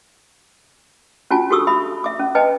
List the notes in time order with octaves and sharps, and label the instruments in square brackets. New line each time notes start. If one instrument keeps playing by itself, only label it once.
[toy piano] C#4 D4 F4 F#4 G#5 A5
F#4 G4 A4 C#6 D#6 E6
E5 B5 D#6
E5 D6
C#4
B4 D#5 G5 A5